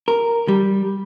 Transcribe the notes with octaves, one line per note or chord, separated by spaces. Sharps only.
A#4
G3